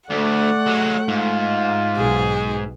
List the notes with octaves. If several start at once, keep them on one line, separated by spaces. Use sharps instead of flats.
D2 A3 D5 F#5
F#3 G#3
G#2 F4
B1 G#4